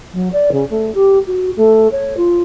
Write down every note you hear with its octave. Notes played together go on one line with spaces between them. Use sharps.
F#3
D5
C#3
A3
G4
F#4
A3
C#5
F4